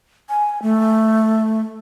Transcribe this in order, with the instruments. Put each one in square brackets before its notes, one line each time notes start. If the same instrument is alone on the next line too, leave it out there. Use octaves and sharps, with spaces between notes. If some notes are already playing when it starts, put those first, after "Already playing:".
[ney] G#5
A3